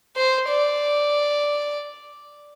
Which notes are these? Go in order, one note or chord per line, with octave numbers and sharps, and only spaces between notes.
C5
D5